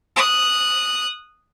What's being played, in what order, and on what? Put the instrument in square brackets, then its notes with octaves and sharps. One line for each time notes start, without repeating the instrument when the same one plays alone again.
[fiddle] D#6 F#6